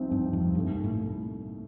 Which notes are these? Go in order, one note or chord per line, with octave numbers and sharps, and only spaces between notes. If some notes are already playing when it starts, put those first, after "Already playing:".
Already playing: C2 C3 F3 C4 D#4
G2
F2
C2 G2 A#2 A3 D#4
A2